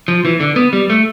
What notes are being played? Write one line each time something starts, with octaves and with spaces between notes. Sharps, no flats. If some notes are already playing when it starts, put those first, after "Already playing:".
F3
E3
D3
B3
G3
A3